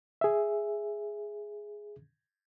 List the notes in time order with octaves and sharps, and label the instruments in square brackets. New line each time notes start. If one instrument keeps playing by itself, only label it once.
[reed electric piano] G#4 E5